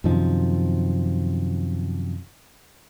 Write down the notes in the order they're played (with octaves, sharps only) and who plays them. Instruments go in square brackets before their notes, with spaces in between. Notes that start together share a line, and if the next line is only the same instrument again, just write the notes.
[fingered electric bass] F#2 C3 D#3 F3